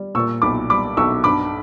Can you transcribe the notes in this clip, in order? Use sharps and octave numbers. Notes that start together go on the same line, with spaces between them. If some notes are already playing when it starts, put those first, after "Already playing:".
Already playing: G3
A#2 C#6 E6
B1 B5 D6
G3 B5 D6
B1 C#6 E6
G2 B5 D6